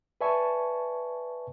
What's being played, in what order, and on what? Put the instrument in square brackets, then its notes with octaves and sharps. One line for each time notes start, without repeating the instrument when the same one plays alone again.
[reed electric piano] B4 D5 E5 G#5 A5 C#6